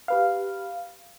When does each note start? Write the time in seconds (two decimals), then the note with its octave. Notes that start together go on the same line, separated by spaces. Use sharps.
0.08 G4 B4 F5